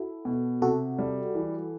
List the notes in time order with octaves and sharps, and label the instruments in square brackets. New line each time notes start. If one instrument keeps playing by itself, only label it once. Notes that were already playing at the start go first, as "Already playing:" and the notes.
Already playing: [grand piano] E4 [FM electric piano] F#4 A4
[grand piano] B2
[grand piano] C3 [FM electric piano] F#4 A4
[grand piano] G3
E3